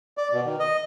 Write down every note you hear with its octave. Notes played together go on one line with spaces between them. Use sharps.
D5
B2
D#3
D#5